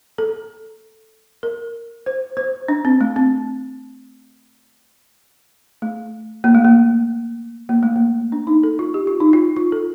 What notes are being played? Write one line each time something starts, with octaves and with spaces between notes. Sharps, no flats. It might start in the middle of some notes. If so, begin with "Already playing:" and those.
A4
A#4
C5
C5
D4
C4
A3
C4
A3
A#3
A3
A#3
A#3
A3
A#3
D4
D#4
A4
F4
G4
F4
D#4
F4
F4
A4